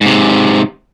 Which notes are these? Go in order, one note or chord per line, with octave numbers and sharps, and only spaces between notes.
G#2 C3